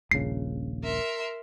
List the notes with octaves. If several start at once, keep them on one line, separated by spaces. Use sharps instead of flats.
D#1 A#1 C#3 C7
A#4 E5 C6